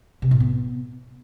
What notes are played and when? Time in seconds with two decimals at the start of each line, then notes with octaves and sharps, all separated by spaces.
0.22 C3
0.31 A2
0.40 B3